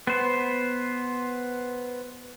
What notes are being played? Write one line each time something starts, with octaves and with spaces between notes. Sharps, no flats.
B3 C5